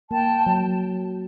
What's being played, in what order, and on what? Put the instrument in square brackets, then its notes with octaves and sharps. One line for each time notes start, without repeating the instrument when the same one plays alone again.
[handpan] A#3 [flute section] G5 A5
[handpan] F#3